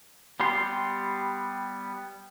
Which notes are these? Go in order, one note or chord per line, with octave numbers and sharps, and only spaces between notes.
G3 B3 G4 C6